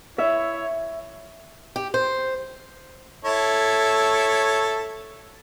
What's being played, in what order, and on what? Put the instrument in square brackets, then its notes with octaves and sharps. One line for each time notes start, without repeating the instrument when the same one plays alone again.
[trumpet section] E4 C#5 [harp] E5
[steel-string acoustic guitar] G4
C5
[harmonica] E4 A4 C#5